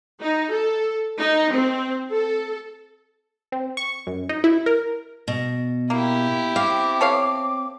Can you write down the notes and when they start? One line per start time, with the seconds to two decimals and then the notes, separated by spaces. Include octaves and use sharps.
0.21 D#4
0.53 A4
1.19 D#4
1.53 C4
2.11 A4
3.52 C4
3.77 C#6
4.07 F#2
4.29 D#4
4.44 E4
4.66 A#4
5.28 B2
5.90 A#3 E4 G4
6.56 C4 F5 D6
7.01 A4 C#5 F5